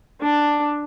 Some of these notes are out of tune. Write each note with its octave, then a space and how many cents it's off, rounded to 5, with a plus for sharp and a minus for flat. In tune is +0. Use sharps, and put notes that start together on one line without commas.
D4 +5